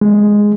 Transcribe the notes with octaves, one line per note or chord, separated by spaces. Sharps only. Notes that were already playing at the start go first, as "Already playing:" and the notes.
G#3